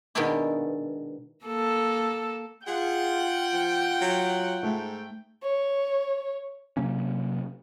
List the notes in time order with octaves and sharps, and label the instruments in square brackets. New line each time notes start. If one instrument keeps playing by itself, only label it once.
[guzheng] B2 D#3 G#3 D4 E4 G4
[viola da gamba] A#3 A4
[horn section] F4 F#5 [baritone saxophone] G#4 [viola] G5
[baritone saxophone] F3
F#3
[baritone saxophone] G#2 [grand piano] A3
[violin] C#5
[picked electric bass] C3 F#3 A#3 C#4